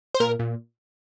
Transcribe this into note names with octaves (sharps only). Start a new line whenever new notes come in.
C5
A#2 A#4
A#2